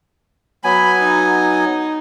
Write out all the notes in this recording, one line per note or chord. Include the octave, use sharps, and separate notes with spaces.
F#3 B3 G#5 B5
D#4